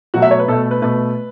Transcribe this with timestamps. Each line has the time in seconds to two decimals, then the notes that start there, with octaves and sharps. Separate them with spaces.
0.14 B2 F#3 A3 F#4
0.22 E5
0.31 C#5
0.39 B4
0.48 B2 A3 A4
0.71 B4
0.82 B2 A3 B4